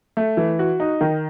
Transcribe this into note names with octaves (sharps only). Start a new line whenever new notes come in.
A3
E3
F#4
D#4
D#3